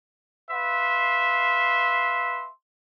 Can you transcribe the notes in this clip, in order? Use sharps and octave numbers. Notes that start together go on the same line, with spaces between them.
B4 E5 F5 C6